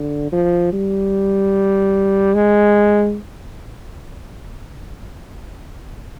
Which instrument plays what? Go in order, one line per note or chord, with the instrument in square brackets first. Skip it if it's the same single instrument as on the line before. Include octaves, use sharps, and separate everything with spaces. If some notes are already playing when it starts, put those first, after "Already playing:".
Already playing: [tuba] D3
F3
G3
G#3